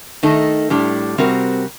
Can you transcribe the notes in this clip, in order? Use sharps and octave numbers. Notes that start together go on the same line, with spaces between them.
D#3 A3 D#4 A4
A2 G3 D4
C3 G3 C4 F#4 A#4